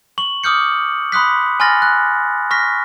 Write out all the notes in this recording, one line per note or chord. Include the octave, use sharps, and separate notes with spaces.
C#6 F#7
D6 D#6 F6 G6 C#7
B5 C6 D#6 F#6 B6
G#5 B5 C6 F6 A6 A#6
F#6
C#6 F6 A#6 B6